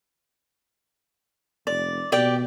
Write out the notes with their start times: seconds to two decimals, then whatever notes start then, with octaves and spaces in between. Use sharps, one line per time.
1.67 F1 D5
2.12 B2 G4 D5 G5